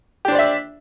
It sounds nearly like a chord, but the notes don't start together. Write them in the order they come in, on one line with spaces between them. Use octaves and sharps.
G4 D4 C5 D5 E5